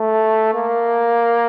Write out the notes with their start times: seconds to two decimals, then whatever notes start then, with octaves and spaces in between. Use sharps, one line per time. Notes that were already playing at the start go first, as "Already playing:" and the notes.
Already playing: A3
0.54 A#3